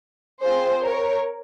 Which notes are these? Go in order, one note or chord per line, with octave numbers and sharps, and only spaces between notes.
C4 F4 G#4 C5
A#4 C#5